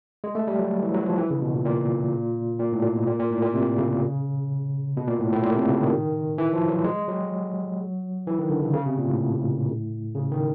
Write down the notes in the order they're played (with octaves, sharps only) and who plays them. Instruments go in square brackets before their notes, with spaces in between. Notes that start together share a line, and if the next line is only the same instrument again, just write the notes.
[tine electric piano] G#3
A3
G3
F#3
E3
F#3
F3
E3
C#3
B2
A#2
A#2
A#2
A2
A#2
B2
A#2
A#2
A2
A#2
C3
C#3
B2
A#2
A2
A2
A#2
C3
C#3
D#3
E3
F3
F#3
G#3
F#3
E3
D#3
D3
C#3
C#3
C3
A#2
A2
C#3
D#3